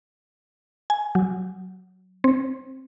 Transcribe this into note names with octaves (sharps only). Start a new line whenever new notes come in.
G#5
F#3
C4